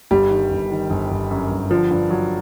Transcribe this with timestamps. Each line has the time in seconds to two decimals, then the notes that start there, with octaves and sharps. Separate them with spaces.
0.11 G1 G3
0.30 D#3
0.51 G1
0.71 D#3
0.90 G1
1.11 G1
1.31 F#2
1.51 G1
1.70 D3 F3
1.91 G2
2.10 F#3